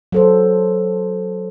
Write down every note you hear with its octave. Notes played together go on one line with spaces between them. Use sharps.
F#3 A4 C5